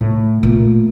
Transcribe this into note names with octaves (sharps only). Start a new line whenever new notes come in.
A2
A#2 A3